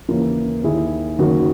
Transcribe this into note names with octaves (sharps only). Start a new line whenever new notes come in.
D#2 C#3 E3 A#3
D#2 D#3 E4 G#4
F#1 F#2 D#3 F#4 A#4